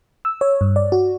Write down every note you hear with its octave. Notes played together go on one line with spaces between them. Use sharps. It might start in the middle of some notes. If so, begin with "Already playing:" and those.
E6
C#5
G2
D5
F#4